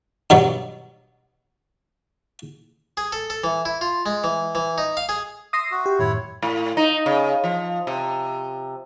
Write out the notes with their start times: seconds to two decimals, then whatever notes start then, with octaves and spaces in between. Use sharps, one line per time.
0.30 G2 B2 F#3
2.97 G#4
3.12 A4
3.30 A4
3.44 E3
3.65 E4
3.81 F4
4.06 G#3
4.24 E3
4.55 E3
4.78 D#4
4.97 F5
5.09 G#4
5.53 E5 C6 D#6 E6 A#6 C7
5.71 F#4
5.86 G4
5.99 F#2 A2 D#3 E4 C#5
6.42 A2
6.77 D#4
7.06 C#3
7.44 F3
7.87 C3